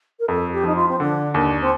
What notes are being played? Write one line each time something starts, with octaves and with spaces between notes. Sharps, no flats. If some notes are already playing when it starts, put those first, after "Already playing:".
A#4
F2 A4
G4
F3 D#4
F4
C4
D3 D4
D#2 D4
C4